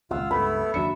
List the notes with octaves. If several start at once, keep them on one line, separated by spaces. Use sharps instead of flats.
D#1 C#2 F4 F#5 E6
C#2 G2 A3 B3 E4 B5
F#1 D#2 F#3 D4 E5 C#7